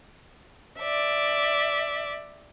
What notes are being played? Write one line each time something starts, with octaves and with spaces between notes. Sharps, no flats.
D5 E5